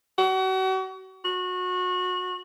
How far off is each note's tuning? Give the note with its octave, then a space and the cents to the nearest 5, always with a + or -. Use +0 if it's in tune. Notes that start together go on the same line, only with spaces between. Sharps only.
F#4 +35
F#4 -25